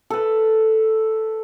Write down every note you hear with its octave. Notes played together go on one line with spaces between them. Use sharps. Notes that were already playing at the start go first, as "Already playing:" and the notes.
A4 B4